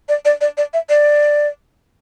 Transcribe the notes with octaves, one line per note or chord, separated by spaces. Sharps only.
D5
D5
D5
D5
E5
D5